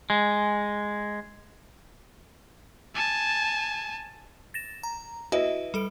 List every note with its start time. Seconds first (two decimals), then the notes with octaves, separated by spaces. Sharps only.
0.10 G#3
2.95 G#5 A5
4.54 A6 A#6 E7
4.83 A#5
5.32 E4 F#4 B4 D#5 E5
5.74 G3 A4 D7